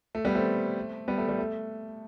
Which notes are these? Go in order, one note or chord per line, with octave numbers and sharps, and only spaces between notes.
A3
G3 B3
A3 C4
G3 B3
A3
G3
A3